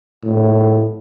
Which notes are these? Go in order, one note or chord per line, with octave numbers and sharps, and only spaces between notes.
A2